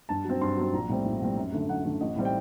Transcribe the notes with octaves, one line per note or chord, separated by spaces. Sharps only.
G2 A5
F#3 C4
G2 C6
F#3 C4
A#1 A#5
A2 G3 C4
A#1
A2 G3 C4
F#2
D3 A3
F#2 F#5
D3 A3
A1 D#5
A2 G3 C4
G5